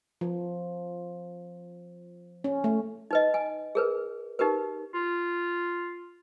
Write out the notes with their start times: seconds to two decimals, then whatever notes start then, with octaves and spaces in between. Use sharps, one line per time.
0.21 F3
2.44 C#4
2.64 A3
3.11 D#4 B4 D#5
3.34 G#5
3.75 G#4 A#4 B4
4.39 D#4 G4 A#4 B4
4.94 F4